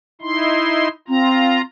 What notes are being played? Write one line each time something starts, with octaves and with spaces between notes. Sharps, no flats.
D#4 E4 C6
C4 F4 A#5